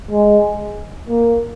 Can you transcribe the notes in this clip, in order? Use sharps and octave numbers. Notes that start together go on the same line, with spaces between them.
G#3
A#3